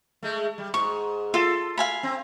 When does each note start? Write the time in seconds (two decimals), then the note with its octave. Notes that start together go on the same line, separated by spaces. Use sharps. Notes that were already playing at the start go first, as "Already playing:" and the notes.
0.23 G#3 A3
0.58 G3
0.74 G#2 C#6
1.34 F4 A4
1.78 F5 G#5 B5
2.03 C4